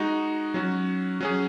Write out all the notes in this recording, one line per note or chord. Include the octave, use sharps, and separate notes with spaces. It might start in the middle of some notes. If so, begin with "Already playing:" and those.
Already playing: G#3 D#4 F#4 D#5
F#3 C#4 F#4
F#3 C#4 G#4